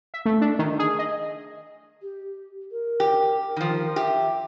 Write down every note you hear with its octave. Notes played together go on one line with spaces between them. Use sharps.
E5
A3
D4
D#3
G#4
D#5
G4
A#4
G4
D#3 F3
G4 E5